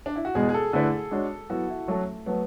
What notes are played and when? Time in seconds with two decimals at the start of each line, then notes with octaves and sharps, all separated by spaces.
0.06 D4
0.16 E4
0.25 F#4
0.35 E2 B2 G#3 G#4
0.49 G#4
0.54 A4
0.73 D3 A3 E4 B4 D5
1.11 G#3 D4 F#4 C#5
1.50 F#3 B3 E4 F#4
1.69 E4
1.88 F#3 A3 C#4 F#4 A4
2.26 F#3 A3 B3